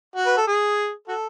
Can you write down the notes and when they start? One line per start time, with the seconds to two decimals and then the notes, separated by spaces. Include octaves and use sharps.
0.16 F#4
0.26 B4
0.37 A4
0.47 G#4
1.08 F#4 A4